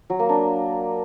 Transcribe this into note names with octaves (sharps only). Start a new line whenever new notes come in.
F#3
A#3
D4